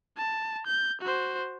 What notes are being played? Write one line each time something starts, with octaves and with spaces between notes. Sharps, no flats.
A5
G6
F#4 C5